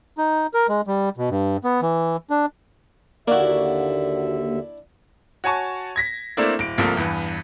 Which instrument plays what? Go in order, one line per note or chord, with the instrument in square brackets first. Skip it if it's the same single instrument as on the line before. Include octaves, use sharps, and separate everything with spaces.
[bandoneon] D#4
A#4
G#3
G3
B2
G2
B3
E3
D4
[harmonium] D#2 D3 E5 [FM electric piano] A#3 F#4 [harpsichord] D4 E4
[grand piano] F#4 C#5 G#5 A5 C#6
G#6 A#6 B6
A3 A#3 C4 D4 E4
D1 D7
C2 C3 F3 A3 A#3
E2 G2 E3